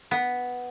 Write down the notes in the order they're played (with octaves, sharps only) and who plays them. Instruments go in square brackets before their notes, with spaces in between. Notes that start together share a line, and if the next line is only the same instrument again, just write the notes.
[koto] B3